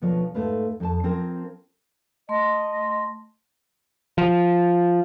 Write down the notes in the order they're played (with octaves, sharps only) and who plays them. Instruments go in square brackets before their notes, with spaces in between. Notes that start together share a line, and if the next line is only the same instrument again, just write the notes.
[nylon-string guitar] D2 B2 F3 B3 C#5
G#2 A3 B4 F5
F2 A4 A5
F3 C4 F4 G#4 A#4
[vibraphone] A3 C6 [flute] D#5
[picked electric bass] F3